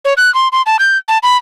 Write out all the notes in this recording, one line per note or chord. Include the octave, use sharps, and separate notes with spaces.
C#5
F#6
C6
C6
A5
G6
A5
B5